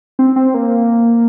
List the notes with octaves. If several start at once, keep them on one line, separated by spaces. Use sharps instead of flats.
C4
C4
A#3